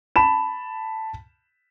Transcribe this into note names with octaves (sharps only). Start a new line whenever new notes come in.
A5 B5 E7